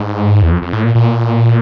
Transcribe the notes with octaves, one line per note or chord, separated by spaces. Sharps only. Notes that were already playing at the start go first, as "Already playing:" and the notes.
Already playing: G#2
E2
F2
F2
A2
A#2
A#2